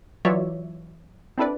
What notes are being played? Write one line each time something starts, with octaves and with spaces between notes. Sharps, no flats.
E3 F#3 F4 C#5 D5 E5
C4 D4 E4 A4 B4 D5